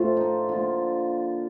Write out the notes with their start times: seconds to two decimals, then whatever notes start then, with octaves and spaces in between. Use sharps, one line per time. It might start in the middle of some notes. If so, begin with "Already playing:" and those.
Already playing: A2 F3 A3 F4 A4
0.17 D#4
0.49 D3 F3 A#3 F4